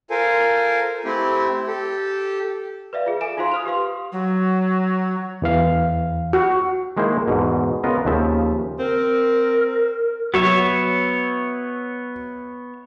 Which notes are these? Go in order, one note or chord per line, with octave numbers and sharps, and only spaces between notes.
F4 A4 A#4 C5 G#5
A3 C4 E4 G4
G4 A4
B4 D5 E5 F5
F4 G#4
A4 E5 G#5 D7 E7
D#4 F4 F#4 C5 F5 C6
D#6 F6 F7
G4 B4 F5 C6
F#3
E2 E3 F5
F#4
D#3 G#3 A#3 E4 C5
E2 G#2 B2
C#3 B3 F4 A#4 D#5
D#2 C#3 F3 E5
C4 A#4
F#3 B3 C#5 E5